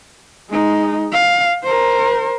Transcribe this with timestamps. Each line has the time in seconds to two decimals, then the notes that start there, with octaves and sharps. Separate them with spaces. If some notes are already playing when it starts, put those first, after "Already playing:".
0.50 G#3 D#4
1.12 F5
1.63 A#4 C5